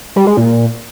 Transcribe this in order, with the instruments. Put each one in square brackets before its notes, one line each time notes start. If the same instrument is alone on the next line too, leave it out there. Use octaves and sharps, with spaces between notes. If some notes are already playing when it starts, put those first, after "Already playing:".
[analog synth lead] G3
G#3
A#2